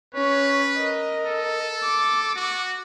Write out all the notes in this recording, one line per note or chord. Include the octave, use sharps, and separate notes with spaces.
C#4 B4 C#5
A#4 D#5
A4
D6
F#4